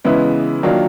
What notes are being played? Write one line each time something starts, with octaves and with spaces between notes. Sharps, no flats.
C#3 E3 G#3 B3 E4
D#3 F#3 A#3 D4 F4